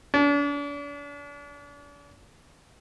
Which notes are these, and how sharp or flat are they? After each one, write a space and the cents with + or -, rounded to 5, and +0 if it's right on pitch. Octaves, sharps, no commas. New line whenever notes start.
D4 -40